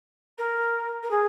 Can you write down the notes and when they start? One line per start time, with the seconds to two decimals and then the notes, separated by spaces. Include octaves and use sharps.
0.38 A#4
1.03 A#4
1.11 G#4